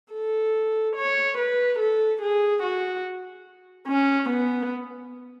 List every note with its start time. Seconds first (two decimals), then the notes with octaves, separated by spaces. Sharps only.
0.13 A4
0.97 C#5
1.38 B4
1.79 A4
2.22 G#4
2.63 F#4
3.88 C#4
4.29 B3